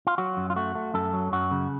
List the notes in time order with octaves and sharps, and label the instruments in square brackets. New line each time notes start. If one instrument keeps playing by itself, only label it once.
[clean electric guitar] F4
F#3 F#4
F#2
F4
A3 F#4
A3
F#2 A4
F#3
F#2 F#4
C#3